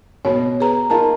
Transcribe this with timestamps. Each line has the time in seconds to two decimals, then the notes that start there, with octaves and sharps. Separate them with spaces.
0.25 B2 B3 C#5
0.60 G#4 B4 A#5
0.90 A#3 D#4 F4 A5 A#5